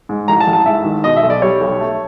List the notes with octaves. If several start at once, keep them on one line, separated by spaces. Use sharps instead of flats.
G#2
A1 A#5
A5
A1
A5
G#2 E5
D#3
B2 D#5
E5
B1
D5
G3 C#5
B1
A3